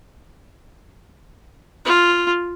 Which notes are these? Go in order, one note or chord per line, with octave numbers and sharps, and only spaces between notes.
F4